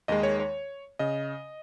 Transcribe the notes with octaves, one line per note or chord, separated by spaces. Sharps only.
D#2 D#3 G#3 D#5
C#5
C#5
C#3 D#5